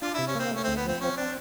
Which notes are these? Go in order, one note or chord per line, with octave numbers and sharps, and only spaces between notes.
D4 F4
C3 E4
C#4
A#3 C4
A3 C#4
D2 C4
B3
F3 C4
C4 C#4
D4